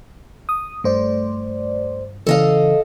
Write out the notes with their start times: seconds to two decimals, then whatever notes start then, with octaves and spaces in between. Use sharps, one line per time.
0.49 D#6
0.84 G2 A3 C5 D5
2.27 C#3 E3 A4 D#5 F5